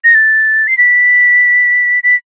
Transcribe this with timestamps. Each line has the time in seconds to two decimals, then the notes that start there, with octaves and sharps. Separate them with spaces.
0.04 A#6
0.15 A6
0.68 C7
0.78 B6
2.03 B6